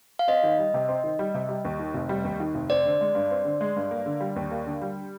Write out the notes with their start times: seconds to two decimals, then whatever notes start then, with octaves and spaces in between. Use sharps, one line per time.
0.19 F5
0.28 C4 D#5
0.43 D#3
0.58 G3
0.74 C3
0.88 C4
1.04 D#3
1.19 G3
1.34 C3
1.49 G3
1.65 D#2
1.79 D#3
1.94 F1
2.09 G3
2.24 D#2
2.40 D#3
2.55 F1
2.70 C4 D5
2.85 D3
3.01 G#3
3.15 G2
3.31 C4
3.45 D3
3.61 G#3
3.76 G2
3.91 A#3
4.06 D3
4.20 G3
4.36 D#2
4.51 A#3
4.66 D3
4.81 G3